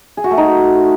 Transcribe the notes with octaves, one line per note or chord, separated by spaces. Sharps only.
G#4
F#4
A3
D#4